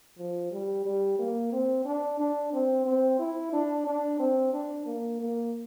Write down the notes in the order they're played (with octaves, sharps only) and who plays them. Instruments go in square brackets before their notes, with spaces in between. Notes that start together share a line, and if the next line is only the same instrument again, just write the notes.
[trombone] F3
G3
G3
A#3
C4
D4
D4
C4
C4
E4
D4
D4
C4
D4
A#3
A#3